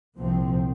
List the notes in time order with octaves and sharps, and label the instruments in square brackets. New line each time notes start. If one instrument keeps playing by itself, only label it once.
[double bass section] C2 A#2 F3 C4